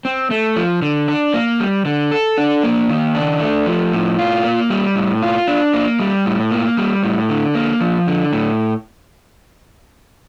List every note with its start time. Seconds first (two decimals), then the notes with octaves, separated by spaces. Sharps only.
0.05 C4
0.31 A3
0.56 F3
0.82 D3
1.08 D4
1.34 A#3
1.60 G3
1.85 D3
2.11 A4
2.38 D4
2.63 A#3
2.89 D#3
3.15 D4
3.41 A3
3.66 F3
3.93 A2
4.19 F4
4.44 A#3
4.70 G3
4.96 A2
5.22 F4
5.48 D4
5.73 A#3
6.00 G3
6.26 A2
6.51 A#3
6.77 G3
7.03 A2
7.29 D3
7.55 A#3
7.81 F3
8.07 D3
8.33 A2